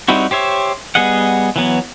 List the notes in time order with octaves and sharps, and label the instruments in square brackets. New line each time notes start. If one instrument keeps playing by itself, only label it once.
[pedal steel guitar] G3 C4 D#4 E4 F#4
G4 C5 C#5 E5
G3 B3 G#4 D#5 F#5
E3 F#3 B3